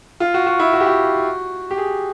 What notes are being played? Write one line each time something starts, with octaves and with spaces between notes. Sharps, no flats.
F4
F#4
F#4
E4
F#4
G4
F#4
G4
G#4